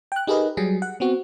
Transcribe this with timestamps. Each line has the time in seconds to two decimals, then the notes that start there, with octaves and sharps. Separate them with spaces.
0.12 G5 F#6
0.27 D#4 G4 G#4 A#4 B4 D#5
0.57 F#3 G3 G#4
0.82 F#5
1.00 B3 C4 F#4